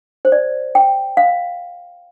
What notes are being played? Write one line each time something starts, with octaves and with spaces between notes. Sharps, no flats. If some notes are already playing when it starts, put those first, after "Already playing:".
C5
D5
G5
F5